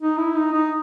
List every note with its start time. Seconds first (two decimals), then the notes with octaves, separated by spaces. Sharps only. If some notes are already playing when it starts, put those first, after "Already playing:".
0.01 D#4
0.18 E4
0.36 D#4
0.52 D#4